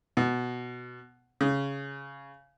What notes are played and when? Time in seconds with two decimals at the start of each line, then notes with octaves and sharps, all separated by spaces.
0.17 B2
1.41 C#3